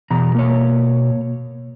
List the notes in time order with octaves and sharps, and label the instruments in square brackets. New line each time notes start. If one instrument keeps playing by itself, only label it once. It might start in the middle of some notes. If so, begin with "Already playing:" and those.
[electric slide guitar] E2 A#5 [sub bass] B2
[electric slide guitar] A#3 C#5